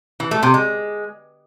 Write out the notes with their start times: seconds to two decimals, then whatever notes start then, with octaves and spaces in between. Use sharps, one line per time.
0.20 E3
0.31 A3
0.43 C3
0.54 G#3